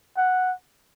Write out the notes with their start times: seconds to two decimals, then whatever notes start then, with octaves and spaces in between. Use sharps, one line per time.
0.17 F#5